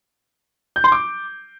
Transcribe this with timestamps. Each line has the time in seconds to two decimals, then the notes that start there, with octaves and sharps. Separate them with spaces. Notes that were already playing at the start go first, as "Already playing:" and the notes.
0.76 G6
0.84 C6
0.92 D6